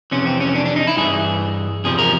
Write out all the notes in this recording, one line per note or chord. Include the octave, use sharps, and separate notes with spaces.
F2 C3 E3 C#4
C4
C#4
D4
D4
D#4
E4
G2 E3 G#4
E2 C3 F3 G#4
A#4